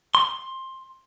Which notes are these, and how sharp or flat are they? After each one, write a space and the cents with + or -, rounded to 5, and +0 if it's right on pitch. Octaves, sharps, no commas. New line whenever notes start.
C6 +15